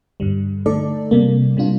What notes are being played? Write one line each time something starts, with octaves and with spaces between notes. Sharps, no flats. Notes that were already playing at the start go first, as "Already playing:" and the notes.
G2 D3 G3
D3 A3 D#4 A4 D5
C3 G3 A#3
C3 G3 D4 F4